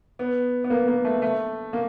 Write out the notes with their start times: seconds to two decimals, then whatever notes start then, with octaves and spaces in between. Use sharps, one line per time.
0.19 B3
0.64 B3
0.70 A#3
0.88 A#3
1.05 A3
1.22 A3
1.73 A#3